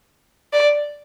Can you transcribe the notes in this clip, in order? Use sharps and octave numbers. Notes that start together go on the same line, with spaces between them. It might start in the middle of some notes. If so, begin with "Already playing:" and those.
D5